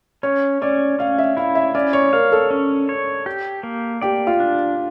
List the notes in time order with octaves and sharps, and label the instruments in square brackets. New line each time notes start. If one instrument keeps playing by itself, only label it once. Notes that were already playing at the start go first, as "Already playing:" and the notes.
[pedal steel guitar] C#4 [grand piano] C#5
[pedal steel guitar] C#4 [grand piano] D5
[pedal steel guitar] C#4 [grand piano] F5
[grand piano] E5
[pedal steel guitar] E4 [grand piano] F5
[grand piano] E5
[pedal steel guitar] C#4 [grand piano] D5
[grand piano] C#5
[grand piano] A#4 [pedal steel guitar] F5
[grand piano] A4
[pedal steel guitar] C#4
C#5
G4
A#3
[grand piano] G4 [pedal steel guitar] D5
[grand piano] F4
[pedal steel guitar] D4